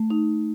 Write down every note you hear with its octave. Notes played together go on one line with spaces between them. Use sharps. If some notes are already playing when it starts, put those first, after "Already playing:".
Already playing: A3
D#4